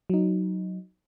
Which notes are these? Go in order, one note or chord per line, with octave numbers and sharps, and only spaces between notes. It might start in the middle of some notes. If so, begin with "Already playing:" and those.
F#3 D#4